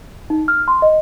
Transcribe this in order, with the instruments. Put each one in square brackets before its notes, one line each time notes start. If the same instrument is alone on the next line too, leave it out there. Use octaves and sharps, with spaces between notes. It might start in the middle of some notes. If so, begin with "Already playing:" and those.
[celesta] D#4
F6
C6
D#5